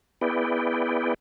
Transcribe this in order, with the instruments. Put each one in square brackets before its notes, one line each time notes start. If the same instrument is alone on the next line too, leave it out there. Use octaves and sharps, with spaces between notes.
[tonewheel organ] B3 E4 G#4 B4 D5 G5